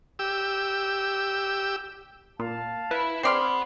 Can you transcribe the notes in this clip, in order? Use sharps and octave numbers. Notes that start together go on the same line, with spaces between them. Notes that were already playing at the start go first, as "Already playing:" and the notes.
G4 E6
A#2 F5 A5
E4 B4
C4 G#4 D5 F#5 B5 C6 F6 C7